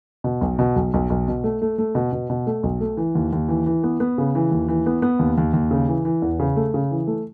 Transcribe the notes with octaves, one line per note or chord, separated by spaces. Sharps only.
B2
B1
B2
B1
B1
B1
B2
A3
A3
A3
B2
B2
B2
A3
B1
A3
E3
D#2
D#2
E3
E3
B3
B3
C#3
E3
D#2
E3
B3
B3
D#2
D#2
D#2
C#3
E3
E3
E2
C#3
A3
C#3
E3
A3